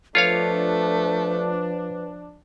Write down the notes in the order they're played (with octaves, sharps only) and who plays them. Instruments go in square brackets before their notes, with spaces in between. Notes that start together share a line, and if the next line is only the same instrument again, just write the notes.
[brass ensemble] F3 D4 [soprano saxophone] A3 [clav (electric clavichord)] F4 C#5 F5 [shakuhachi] B4